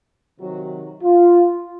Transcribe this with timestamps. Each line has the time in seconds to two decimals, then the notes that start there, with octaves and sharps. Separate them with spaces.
0.39 C3 D#3 F#3 F#4
1.02 F4